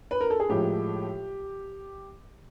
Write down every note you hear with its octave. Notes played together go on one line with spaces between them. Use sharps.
B4
A#4
A4
G#4
A2 F3 G#3 G4